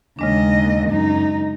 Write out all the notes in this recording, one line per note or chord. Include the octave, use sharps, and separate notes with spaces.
D#2 C#3 G#3 D4 D#5
F#2 D#4